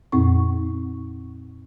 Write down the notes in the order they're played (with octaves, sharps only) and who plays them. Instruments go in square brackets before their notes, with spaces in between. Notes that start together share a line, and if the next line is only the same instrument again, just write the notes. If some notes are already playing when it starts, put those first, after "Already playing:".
[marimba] F2 A#2 C4 C#6